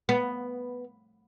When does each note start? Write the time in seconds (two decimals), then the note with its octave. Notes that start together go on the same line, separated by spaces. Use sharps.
0.09 B3